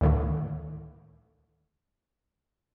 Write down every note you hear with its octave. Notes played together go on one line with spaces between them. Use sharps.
D2 A2 D3 D#3 A3